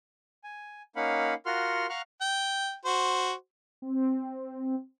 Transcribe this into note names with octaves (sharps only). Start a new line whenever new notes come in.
G#5
A#3 C#4 D#4 F5 F#5 B5
F4 F#4 A#4 F#5 C6 F6
F5 F#5 A#5 C#6 F6 F#6
G5
F#4 C5
C4